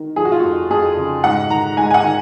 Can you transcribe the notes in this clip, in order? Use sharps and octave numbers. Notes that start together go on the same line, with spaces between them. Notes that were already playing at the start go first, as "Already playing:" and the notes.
Already playing: D#3
F3 G#4
F#4
F4
F2 F#4
F2 G#4
C#3
G#2 F#5
D#3 A#5
G#2 G#5
G#5
F#5
D#3